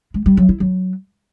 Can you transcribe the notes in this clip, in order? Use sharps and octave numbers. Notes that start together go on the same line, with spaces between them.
G#3
G3
F#3
E4
F#3